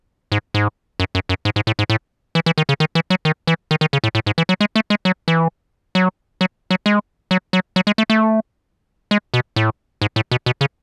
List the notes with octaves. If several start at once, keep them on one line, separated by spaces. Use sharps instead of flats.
G#2
G#2
F#2
F#2
F#2
G#2
G#2
A2
G#2
A2
E3
E3
D#3
C#3
D#3
E3
F#3
D#3
E3
D#3
D#3
C#3
A2
A2
G#2
E3
F#3
G#3
A3
G#3
F#3
E3
F#3
F#3
F#3
G#3
F#3
F#3
F#3
G#3
A3
A3
G#3
B2
A2
G#2
A2
B2
B2
C#3